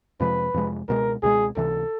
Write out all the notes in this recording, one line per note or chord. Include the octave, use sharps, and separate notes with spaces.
F2 C3 F3 G#3 B4
F2 C3 F3 G#3
C#2 B2 G#3 A#4
C#2 B2 G#3 G#4
C#2 C3 E3 A4